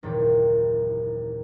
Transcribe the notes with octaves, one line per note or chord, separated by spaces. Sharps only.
F#1 D#2 A#2 E3 G4